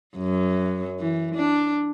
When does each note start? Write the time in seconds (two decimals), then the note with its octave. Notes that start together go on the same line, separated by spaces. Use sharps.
0.17 F#2
0.99 E3
1.36 D4